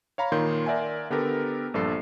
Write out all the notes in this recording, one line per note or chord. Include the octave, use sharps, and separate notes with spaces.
C#5 F5 A#5 B5
A#2 D#3 C#5 C6 G6
A#4 D5 E5 F#5 G#5
D3 B3 G4 A4 A#4
A#1 G2 A4 C7